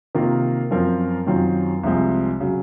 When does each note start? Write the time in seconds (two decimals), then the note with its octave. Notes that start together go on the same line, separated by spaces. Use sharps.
0.15 C3 D#3 A#3 F4 A#4
0.71 F#2 F3 C4 F4 A#4
1.27 F#2 D#3 F#3 C4 F4
1.83 C2 C3 F3 G#3 C4
2.41 C#3 F#3